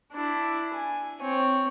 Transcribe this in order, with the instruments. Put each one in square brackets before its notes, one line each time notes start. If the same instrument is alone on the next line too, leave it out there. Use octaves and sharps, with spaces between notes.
[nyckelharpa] D4 E4
G#5
C4 C#5